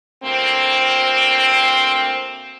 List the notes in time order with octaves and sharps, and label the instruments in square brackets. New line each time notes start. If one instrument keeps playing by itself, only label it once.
[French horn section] D2 A#3 C4